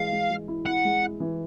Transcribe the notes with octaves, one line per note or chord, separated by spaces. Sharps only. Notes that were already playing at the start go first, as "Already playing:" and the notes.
Already playing: E3 G#3 F5
G#3
G#3
E4
E4 F#5
G#3
E4
E3